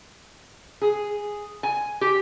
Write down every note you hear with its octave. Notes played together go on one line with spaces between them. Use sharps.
G#4
G#5
G4